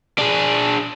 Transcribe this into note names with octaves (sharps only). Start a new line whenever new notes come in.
D4 G#4